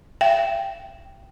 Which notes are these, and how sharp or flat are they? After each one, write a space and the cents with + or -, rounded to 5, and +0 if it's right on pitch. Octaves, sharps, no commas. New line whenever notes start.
E5 +35 G5 +0